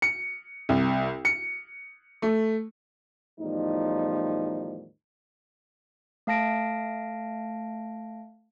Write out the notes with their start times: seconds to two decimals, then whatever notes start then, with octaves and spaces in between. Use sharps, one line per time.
0.02 C#7
0.69 C2
1.25 C#7
2.22 A3
3.38 E2 A2 D#3 F3 G3 D#4
6.27 A3 F5 A5 A#6 D7